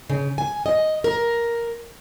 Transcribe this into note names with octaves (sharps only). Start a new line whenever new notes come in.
C#3
G#5
D#5
A#4